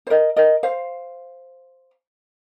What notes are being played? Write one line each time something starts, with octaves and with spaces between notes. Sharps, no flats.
C5
A#4 D#5
A#4 D#5
C5 F5